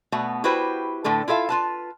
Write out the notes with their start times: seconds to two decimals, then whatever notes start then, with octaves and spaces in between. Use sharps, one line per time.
0.12 B2 A3 B3 F#4
0.44 E4 F#4 G4 B4 C5
1.04 A2 D3 A3 A4
1.28 E4 F4 A4 E5 F5
1.49 F4 B4 A5